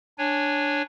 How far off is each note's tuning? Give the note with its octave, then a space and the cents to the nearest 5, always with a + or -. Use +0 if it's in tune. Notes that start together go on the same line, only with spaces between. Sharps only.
D4 +0 C#5 +0 G#5 -15